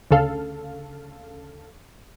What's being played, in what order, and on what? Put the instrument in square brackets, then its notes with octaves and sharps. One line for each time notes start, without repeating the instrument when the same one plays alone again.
[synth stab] D2 C#3 A4 F5